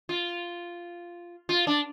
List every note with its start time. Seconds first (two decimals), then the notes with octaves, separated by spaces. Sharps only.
0.09 F4
1.49 F4
1.67 D4